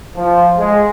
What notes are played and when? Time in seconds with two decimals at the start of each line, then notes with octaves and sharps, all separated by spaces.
0.16 F3
0.58 G#3